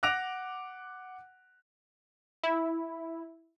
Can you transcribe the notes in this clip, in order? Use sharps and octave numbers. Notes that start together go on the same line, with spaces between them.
F#5 D6 F#6 A#6 D7 F7
E4